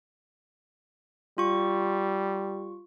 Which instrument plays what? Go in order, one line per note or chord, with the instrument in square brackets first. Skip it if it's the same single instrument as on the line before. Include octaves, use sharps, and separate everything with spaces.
[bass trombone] G3 [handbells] F4 C#6